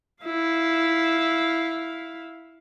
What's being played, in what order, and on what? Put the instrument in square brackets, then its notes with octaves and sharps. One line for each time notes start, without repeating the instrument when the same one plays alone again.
[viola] E4 F5